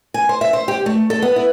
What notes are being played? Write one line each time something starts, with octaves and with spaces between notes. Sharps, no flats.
G#5
C5
E5
C5
G4
A3
A4
B3
E4